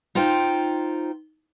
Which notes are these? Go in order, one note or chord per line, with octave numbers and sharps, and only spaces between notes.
D#4 F4 C5 G5